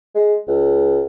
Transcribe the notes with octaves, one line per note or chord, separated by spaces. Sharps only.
G#3
C#2